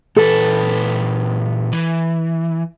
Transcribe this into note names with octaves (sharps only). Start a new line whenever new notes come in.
A#2 E3 A4 B4
E3